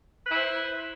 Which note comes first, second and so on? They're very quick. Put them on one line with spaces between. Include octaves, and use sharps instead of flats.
B4 E4 C5